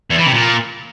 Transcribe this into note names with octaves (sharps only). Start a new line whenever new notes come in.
E2
E3
C3
A#2